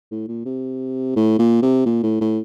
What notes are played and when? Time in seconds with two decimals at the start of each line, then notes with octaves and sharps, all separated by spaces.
0.11 A2
0.28 A#2
0.45 C3
1.16 A2
1.39 A#2
1.62 C3
1.86 A#2
2.03 A2
2.21 A2